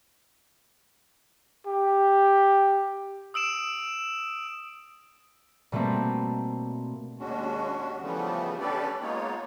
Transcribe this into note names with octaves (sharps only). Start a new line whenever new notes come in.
G4
D#6 E6 D7 E7
B2 G3 A3 A#3 C4
D#2 G#3 C#4 D4 F#4
C#3 E3 F3 G3 A3 B3
C#4 D4 G4 A4 B4 D5
G#3 A#3 B3 D#4 F4 C#5